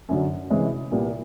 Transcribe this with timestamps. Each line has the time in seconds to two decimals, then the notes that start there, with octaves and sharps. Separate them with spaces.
0.09 F#2 D3 F#3
0.50 C3 E3 G#3 C#4 E4
0.91 C2 A#2 G3 B3